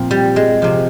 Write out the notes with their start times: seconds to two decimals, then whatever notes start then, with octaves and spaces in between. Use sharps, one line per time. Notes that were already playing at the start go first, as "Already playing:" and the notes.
Already playing: A#2 F3 C4
0.11 G3
0.36 G#3
0.62 C3 F3